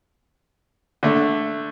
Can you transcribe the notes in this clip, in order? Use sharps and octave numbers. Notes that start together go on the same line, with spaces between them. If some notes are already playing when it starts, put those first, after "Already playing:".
D3 A3